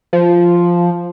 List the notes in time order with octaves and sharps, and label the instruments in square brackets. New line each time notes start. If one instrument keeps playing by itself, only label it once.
[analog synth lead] F3